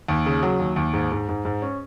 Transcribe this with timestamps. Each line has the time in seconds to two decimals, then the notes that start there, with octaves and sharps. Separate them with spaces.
0.08 D#2
0.26 C#3
0.42 F#3
0.59 D#2
0.76 D#2
0.93 G#2
1.12 G#2
1.29 G#2
1.45 G#2
1.62 C#4